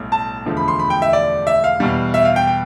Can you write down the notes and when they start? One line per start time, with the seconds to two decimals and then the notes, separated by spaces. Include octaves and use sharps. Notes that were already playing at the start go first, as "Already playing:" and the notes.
Already playing: B1 A2 G3
0.12 A5
0.45 E1 D2 D3 F3
0.57 B5
0.68 C6
0.79 B5
0.90 G5
1.02 E5
1.13 D5
1.47 E5
1.64 F5
1.80 E2 B2 G3
2.14 E5
2.25 F5
2.36 G5
2.47 G5